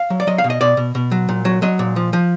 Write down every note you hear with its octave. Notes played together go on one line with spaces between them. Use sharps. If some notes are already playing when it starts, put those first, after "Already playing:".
Already playing: F5
F#3
D5
F#3 D#5
F5
B2
D#5
B2 D5
B2
B2
F#3
A#2
F#3
F#3 D#5
A#2
F3
F3